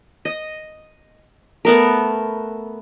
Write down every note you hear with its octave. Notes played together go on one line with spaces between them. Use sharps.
D#5
A3 B3 A#4